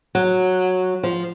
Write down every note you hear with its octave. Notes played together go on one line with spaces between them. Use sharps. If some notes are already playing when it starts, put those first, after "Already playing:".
F#3
F3